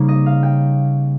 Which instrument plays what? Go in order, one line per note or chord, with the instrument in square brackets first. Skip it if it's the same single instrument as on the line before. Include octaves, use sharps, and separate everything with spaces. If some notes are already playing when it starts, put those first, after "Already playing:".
Already playing: [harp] C#3 G3 A#3 D#4 C#5
D#5
F5
G5